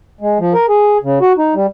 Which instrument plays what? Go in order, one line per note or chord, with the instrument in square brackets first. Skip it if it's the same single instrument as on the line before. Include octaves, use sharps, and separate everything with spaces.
[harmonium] G#3
F3
A#4
G#4
C#3
F#4
D#4
G3